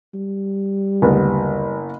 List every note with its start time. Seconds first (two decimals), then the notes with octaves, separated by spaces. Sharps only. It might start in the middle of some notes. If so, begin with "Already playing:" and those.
0.14 G3
1.02 F#1 D2 B3